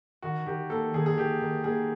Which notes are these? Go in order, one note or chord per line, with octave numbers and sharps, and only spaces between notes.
D#3 F#4
D#3 G4
A#3 A4
D#3 G#4
G#4
D#3 G4
D#3
A#3 G#4